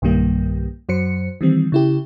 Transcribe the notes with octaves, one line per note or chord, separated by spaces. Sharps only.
B1 G2 D#3 G3 A#3
F#2 F#3 C5 C#7
D#3 E3 G3 C4
C#3 E4 G4